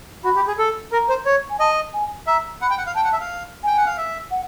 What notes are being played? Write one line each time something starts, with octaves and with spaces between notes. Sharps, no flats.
F#4 B5
G4
G#4
A4
A#4 A#5
C5
C#5
G#5
D#5 A5
G#5
E5 A#5
F#5 B5
G5
F#5
F5
G5 A5
F#5
E5
F5
G5 G#5
F#5
F5
E5
F#5